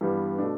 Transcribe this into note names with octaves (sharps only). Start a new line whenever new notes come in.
G2 E3 G3 B3
B2 A3 D4